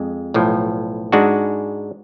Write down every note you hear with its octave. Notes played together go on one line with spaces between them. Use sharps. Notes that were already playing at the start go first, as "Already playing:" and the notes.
Already playing: F2 G#3
B1 A2 F3
G#2 G#3 D4 F#4